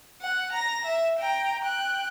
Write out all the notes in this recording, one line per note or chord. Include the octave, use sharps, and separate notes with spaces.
F#5
A#5 A#6
E5
G5 A#5
G5 F#6